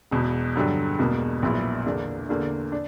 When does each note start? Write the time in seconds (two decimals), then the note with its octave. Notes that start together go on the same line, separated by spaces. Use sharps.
0.11 E1 E2 B2
0.56 G2 D3 F#3
0.99 E1 E2 B2 A#3
1.42 A#1 A#2 F#3 B3 E4
1.86 E2 D3 A#3 D4
2.29 E2 D3 A#3 D4
2.72 D4